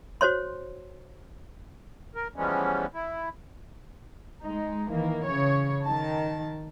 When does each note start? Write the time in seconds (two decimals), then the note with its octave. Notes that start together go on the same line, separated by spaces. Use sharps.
0.21 F#4 C5 C#5 C6
2.15 A#4
2.36 E3 F3 G3 G#3 B3 C#4
2.94 E4
4.43 G#3 D#4
4.89 D#3 E3 A#3
5.27 C#3 C#5
5.85 D#3 A5